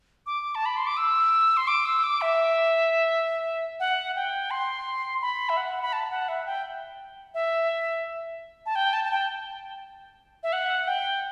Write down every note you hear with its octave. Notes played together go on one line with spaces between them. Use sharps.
D6
A5
B5
C6
D6
E6
C6
D6
E6
D6
E5
F#5
G5
C6
B5
E5
F#5
B5
A5
F#5
E5
G5
E5
A5
G5
A5
A5
G5
E5
F#5
G5